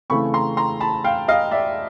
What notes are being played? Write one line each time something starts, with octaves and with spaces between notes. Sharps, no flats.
C#3 E3 A3 C4 B5 C#6
A#5 C6
A#5 C6
A5 B5
F5 G5
D#5 F5
D5 E5